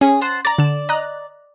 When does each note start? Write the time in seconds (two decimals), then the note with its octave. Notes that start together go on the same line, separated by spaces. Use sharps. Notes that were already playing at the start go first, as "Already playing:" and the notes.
0.01 C#4 G#4
0.21 C5 F#5 A5
0.45 D5 A#5 A6
0.59 D3 E7
0.89 D#5 A#5 F#6